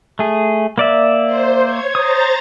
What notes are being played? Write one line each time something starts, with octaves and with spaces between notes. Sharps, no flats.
A3 G#4
A#3 D5 E5
C5
C#5 G#6
C5 A#5 D#6 A6